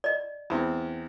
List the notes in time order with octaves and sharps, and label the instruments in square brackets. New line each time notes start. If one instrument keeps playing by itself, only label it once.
[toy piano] D5 D#5
[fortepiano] E2 C4